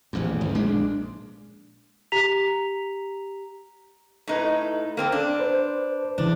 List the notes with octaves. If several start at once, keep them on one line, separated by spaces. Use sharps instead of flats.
D#1 A1 E2
F1
A#1 G#3 A#3 D4
G4 A#5 B6 F7
A2 D#4 B4
A#3 C4 A4
D4
B4 C5
A1 C#3 E3 D4